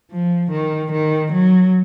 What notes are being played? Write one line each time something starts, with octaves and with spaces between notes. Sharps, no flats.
F3
D#3
D#3
F#3